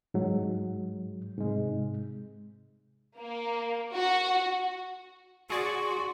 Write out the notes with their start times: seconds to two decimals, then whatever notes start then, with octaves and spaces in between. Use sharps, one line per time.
0.14 G#2 F#3 G#3
1.38 G#2 C3 G#3
3.19 A#3
3.95 F#4
5.50 F#4 G#4 D5 C6 C#6